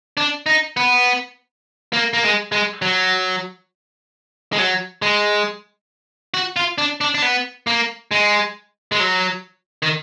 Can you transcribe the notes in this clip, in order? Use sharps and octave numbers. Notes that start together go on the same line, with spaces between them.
D4
D#4
B3
A#3
A#3
G#3
G#3
F#3
G#3
F#3
G#3
F#4
F4
D4
D4
D4
B3
A#3
G#3
G#3
F#3
D#3